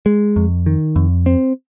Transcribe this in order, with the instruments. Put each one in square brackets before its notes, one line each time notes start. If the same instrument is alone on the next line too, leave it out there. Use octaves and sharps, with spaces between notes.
[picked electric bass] G#3
F2
D#3
F2
C4